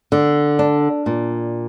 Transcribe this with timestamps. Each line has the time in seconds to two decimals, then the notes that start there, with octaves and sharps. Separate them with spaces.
0.12 D3
0.59 D4
1.06 A#2